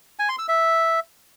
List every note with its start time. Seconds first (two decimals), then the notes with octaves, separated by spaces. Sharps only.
0.19 G#5
0.29 C6
0.39 E6
0.48 E5